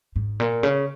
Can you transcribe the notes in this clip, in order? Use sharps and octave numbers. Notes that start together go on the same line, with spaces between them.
G#2
A#2
C#3